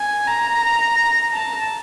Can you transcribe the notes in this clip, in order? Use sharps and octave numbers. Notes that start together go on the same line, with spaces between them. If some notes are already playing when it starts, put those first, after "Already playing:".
Already playing: G#5
A#5
A5